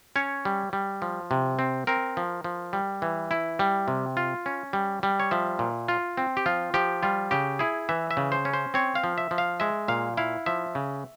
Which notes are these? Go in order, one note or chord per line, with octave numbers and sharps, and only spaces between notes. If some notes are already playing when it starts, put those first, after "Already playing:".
C#4 C#5
G3
G3
F3
C3
C4
C4 A#4
F3
F3
G3
E3
E4
G3
C3
F4
C#4
G3
G3
C#5
F3 E5
A#2
F4
C4
G4
F3 F4
F3 G4
G3 F4
C#3 G4
E4 G#4
E3 E5
E5
C#3
C5
C#4
C5
C4 C#5
F5
F3
E5
F3
F5
G#3 E5
A#2 F5
E4 F5
F3 E5
C#3